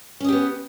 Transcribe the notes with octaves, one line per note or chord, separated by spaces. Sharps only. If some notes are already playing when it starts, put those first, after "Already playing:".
B3 C#4 G4 D#5